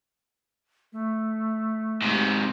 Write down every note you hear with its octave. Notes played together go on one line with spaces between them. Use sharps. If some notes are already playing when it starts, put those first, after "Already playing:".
A3
G#2 C3